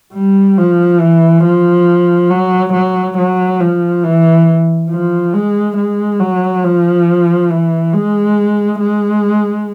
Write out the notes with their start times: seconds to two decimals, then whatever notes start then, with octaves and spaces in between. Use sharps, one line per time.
0.14 G3
0.58 F3
1.00 E3
1.44 F3
2.30 F#3
2.74 F#3
3.18 F#3
3.61 F3
4.03 E3
4.90 F3
5.34 G#3
5.77 G#3
6.20 F#3
6.64 F3
7.51 E3
7.93 G#3
8.80 G#3